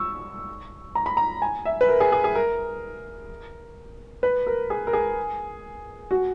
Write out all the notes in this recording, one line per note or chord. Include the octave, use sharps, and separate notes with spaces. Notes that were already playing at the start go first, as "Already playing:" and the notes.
Already playing: C#6 E6
A#5
B5
A#5
G#5
E5
B4
A#4
G#4
G#4
G#4
A#4
B4
A#4
G#4
A#4
G#4
F#4